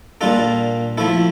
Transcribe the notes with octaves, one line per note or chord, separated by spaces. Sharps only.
A#2 G3 D4 F4 A4
F3 A3 E4 A4